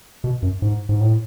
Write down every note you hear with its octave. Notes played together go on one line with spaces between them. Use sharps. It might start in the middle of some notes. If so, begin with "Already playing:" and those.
B2
F#2
G#2
G#2
A2